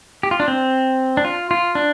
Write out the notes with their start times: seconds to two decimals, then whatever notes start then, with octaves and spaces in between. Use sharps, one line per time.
0.23 G4
0.31 F4
0.40 D4
0.48 C4
1.17 D4
1.25 F4
1.51 F4
1.75 D4